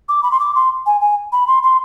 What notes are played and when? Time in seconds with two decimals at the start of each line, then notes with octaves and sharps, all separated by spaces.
0.09 D6
0.23 B5
0.31 C6
0.40 D6
0.55 C6
0.86 G#5
1.01 G#5
1.32 B5
1.47 C6
1.63 C6